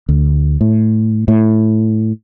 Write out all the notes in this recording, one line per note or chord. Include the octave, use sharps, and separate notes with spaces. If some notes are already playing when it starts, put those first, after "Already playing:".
D2
A2
A2